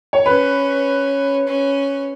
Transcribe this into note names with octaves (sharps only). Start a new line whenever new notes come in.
C#5
C#4 B4
C#4